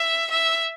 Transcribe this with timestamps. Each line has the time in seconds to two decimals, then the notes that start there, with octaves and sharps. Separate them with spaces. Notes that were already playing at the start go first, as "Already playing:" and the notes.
Already playing: E5
0.30 E5